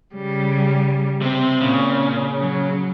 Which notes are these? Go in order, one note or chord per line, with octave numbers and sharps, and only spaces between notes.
C#3 G3
C3 C4
A#2 C#3
F#3